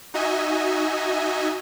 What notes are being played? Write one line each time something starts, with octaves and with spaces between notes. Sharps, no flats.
D#4 F#4 D#5 E5 G#5